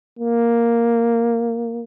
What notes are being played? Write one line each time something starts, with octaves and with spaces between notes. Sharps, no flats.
A#3